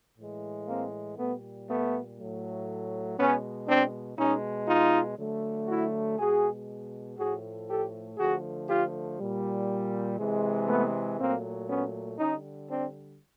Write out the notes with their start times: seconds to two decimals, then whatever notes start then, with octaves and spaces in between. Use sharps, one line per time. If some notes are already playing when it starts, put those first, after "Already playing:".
0.17 A2 E3 G#3
0.67 A#3 C4
1.17 A#2 G3 A3 B3
1.68 A3 B3
2.18 A2 F#3 A3
3.17 B2 G#3 B3 C#4
3.67 C4 D4
4.17 B2 G#3 C#4 D#4
4.68 D#4 F4
5.18 D3 F#3 A3
5.68 E4 F#4
6.18 B2 G#3 F#4 G#4
7.18 A2 F3 A3 F#4 G#4
7.68 G4 A4
8.18 D3 F3 A3 F#4 G#4
8.68 F4 G4
9.19 A#2 G3
10.18 C3 E3 G#3
10.68 A3 B3
11.18 A#2 F#3 A3 A#3 C4
11.68 B3 C#4
12.18 D3 G3 C#4 D#4
12.69 C4 D4